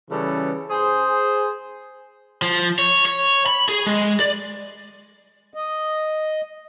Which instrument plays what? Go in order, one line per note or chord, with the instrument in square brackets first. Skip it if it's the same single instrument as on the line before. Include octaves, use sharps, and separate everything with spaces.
[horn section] C#3 E3 G3 C#4 A4 B4
G#4 C5
[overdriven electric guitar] F3
C#5
C#5
B5
G#4
G#3
D5
[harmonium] D#5